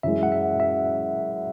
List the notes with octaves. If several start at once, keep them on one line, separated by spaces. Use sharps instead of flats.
F#2 E3 G#3 E5
F#5
E5
E5